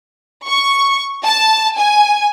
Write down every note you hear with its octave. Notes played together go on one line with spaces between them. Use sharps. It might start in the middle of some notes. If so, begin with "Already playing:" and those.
C#6
A5
G#5